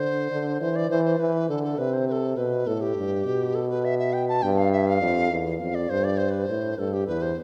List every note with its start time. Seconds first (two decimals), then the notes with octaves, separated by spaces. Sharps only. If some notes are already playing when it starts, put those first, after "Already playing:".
Already playing: D3 C5
0.32 D3
0.61 E3 C5
0.76 D5
0.90 E3 C5
1.05 C5
1.19 E3 B4
1.49 D3 A4
1.64 A4
1.78 C3 B4
1.93 C5
2.08 B4
2.12 A4
2.37 B2 B4
2.67 A2 A4
2.81 G4
2.96 G2
3.25 B2
3.55 A4
3.70 B4
3.84 E5
3.99 E5
4.13 G5
4.28 A5
4.42 G2 G5
4.58 F5
4.72 E5
4.88 F5
5.01 F2
5.31 E2
5.60 F2 F5
5.75 D5
5.90 G2 C5
6.04 D5
6.18 C5
6.31 B4
6.44 A2 C5
6.78 G2 A4
6.93 G4
7.07 E2 B4
7.22 C5